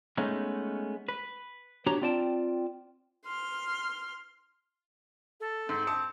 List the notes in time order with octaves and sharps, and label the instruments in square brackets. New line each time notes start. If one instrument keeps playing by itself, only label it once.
[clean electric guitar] G#3 A3 B3 C#4 D#4
B4
B3 D4 F#4 G4 C#5 A#5
C4 F4 D5 G5 A5
[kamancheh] C6 F6
[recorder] A4
[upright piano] G#2 [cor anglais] C4
[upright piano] A5 D#6 C#7